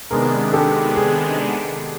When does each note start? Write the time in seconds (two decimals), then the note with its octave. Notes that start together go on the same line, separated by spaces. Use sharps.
0.10 C3 D#3 G#3 B3 D4 G#4 A#4
0.53 G4 A4
0.96 G#4